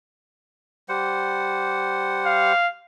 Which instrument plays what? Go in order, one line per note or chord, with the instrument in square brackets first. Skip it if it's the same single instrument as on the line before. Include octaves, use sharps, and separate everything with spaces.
[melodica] G3 C5 F#5
[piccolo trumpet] F5